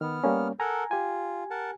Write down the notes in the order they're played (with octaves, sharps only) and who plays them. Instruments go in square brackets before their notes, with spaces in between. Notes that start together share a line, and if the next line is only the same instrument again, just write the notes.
[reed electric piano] D#3 [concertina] B3 F6
[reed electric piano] G3 A#3 C#4
[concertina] A4 A#4 F#5 [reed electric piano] G#5 A#5
[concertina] F4 [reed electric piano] G4 G#5
[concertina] A#4 F#5 A5